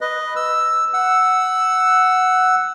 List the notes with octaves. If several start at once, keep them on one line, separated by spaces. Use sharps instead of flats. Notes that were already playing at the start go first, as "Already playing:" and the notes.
B4 D#5
E6
F#5 E6